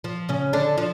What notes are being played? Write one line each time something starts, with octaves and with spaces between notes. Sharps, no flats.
F3
C#3 C#4
D3 D4
F3